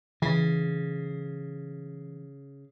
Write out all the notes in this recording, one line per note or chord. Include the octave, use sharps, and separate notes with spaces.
C#3 E3